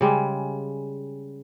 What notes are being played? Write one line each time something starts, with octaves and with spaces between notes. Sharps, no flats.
C#3 G3 G#3